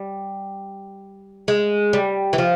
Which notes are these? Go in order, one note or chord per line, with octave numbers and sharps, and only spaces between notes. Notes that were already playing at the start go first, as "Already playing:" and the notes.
Already playing: G3
G#3
G3
E3
F3